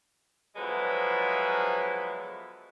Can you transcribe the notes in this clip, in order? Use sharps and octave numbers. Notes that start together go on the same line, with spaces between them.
D3 F3 F#3 G#3 B3 E4